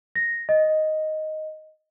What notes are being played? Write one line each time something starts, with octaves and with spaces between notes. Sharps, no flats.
A#6
D#5